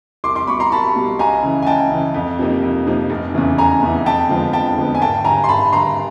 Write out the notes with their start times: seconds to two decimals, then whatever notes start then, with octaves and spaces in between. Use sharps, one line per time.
0.24 C2 C6 D6
0.35 C6 D6
0.47 B2 G3 B5 C#6
0.60 A#5 C6
0.72 C2 A5 B5
0.96 B2 G3
1.19 C#2 G#5 A#5
1.43 C#3 E3
1.62 G#5
1.67 C#2 G5 A5
1.91 C#3 E3
2.14 F2
2.39 C3 F3 A#3 D#4
2.63 F2
2.86 C3 F3 A#3 D#4
3.10 F1
3.34 E2 C#3 E3
3.58 F1 G#5 A#5
3.82 E2 C#3 E3
4.06 F2 G5 A5
4.29 D3 F3 G#3 B3
4.53 F2 G5 A5
4.78 D3 F3 G#3 B3
4.95 G#5
5.02 G#1 G5 A5
5.24 G2 D3 G#5 A#5
5.44 C6
5.49 G#1 A5 B5
5.72 G2 D3 A#5 C6